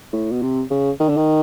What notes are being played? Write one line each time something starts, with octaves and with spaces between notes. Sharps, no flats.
A2
B2
C3
C#3
D#3
D3
D#3